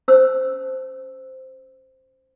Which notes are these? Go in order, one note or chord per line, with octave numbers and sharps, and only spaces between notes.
C#4 C5 A5 E6